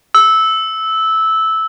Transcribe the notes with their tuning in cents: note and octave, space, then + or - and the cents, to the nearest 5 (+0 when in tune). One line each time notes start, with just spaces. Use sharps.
E6 -10